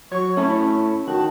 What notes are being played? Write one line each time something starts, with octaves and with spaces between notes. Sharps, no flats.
F#3 C#5 C#6
A3 C#4 E4 C#5 A5
D#3 F#4 A5